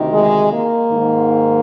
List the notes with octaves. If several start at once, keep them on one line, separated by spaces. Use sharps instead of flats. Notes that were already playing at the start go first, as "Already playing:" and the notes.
Already playing: D2 C3 D#3
G#3
A#3
G#2 D#3